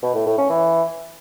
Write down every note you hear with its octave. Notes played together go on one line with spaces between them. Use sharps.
B2
A2
A2
C#4
E3